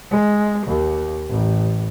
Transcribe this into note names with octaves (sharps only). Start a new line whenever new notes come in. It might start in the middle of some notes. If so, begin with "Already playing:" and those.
G#3
D#2
A1